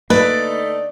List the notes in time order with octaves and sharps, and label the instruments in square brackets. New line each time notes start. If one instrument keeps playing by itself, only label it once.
[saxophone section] D3 A3 D#4 [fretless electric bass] A#3 [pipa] B4 [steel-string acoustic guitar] D5